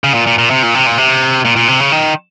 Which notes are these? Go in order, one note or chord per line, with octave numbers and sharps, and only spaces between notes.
C#3
A#2
A#2
A#2
C3
A#2
C3
A#2
C3
A#2
A#2
C3
C#3
D#3